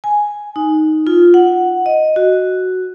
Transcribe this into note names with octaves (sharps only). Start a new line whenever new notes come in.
G#5
D#4
F4
F#5
D#5
F#4